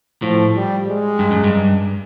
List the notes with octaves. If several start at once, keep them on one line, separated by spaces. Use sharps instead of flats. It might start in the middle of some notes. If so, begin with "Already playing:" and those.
A2 F3
G3
G#3
G2
F#2
G2